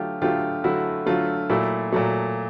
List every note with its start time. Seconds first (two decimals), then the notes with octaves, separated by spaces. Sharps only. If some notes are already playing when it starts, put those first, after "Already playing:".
Already playing: D3 F#3 A3 F4 G4
0.22 D3 F#3 A3 F4 G4
0.64 D3 F#3 A3 E4 F#4
1.06 D3 F#3 A3 F4
1.50 A#2 F#3 A3 E4
1.92 A#2 F#3 A3